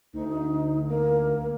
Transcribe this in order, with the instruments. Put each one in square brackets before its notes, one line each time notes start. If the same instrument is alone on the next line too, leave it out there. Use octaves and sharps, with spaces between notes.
[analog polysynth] D2 [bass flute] D#4
[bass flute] A#3